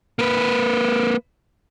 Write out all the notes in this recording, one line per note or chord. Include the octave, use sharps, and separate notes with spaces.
A#3 B4